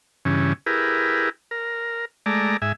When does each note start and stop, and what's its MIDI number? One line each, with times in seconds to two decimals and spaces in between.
0.25 0.53 43
0.25 0.53 49
0.25 0.53 52
0.25 0.53 61
0.66 1.29 64
0.66 1.29 67
0.66 1.29 68
0.66 1.29 70
0.66 1.29 71
1.51 2.05 70
2.26 2.57 56
2.26 2.57 57
2.26 2.57 74
2.26 2.57 82
2.62 2.72 44
2.62 2.72 76
2.62 2.72 80